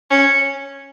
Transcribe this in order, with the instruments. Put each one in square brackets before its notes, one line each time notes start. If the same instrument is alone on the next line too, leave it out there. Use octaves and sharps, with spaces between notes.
[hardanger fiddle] C#4